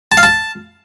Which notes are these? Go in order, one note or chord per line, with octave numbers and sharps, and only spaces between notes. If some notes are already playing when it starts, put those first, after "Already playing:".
A5
F5
A5